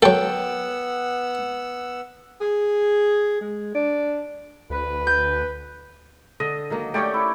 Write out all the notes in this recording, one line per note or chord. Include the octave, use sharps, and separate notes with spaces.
F#3 B3 A4 F#5 G5 E6
G#4
G#3
D4
D2 B4
G6
D3 D#5
D#3 F#3 A#3
A3 C#4 G4 C#5 D5 G5
E4